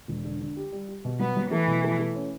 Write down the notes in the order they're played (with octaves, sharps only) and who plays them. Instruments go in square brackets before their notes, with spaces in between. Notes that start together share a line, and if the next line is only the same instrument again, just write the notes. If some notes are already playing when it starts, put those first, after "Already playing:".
[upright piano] E1
D3
D3
G4
G3
G4
B2
[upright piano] F#3 [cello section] B3
[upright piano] F#3
[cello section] E3 [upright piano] A3
[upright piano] B2
A3
A3
C#4